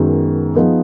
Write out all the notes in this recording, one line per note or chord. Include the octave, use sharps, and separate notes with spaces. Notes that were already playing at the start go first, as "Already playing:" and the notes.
Already playing: F#2 D#3 G#3 B3
F3 B3 D#4 G#4